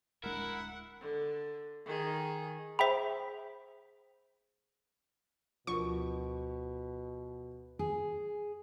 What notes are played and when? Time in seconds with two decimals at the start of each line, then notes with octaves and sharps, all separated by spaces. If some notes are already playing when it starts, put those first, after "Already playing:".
0.24 D1 G#3 D4 E4 A#4 F#5
1.01 D3
1.86 D#3 G#4
2.79 G#4 C5 E5 G5 B5
5.67 D2 B2 F3 A#4 C#6
7.79 G#4